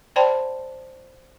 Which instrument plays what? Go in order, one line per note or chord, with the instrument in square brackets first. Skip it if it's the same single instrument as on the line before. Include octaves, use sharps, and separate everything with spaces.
[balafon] C5 D5 G5 A5 B5 C6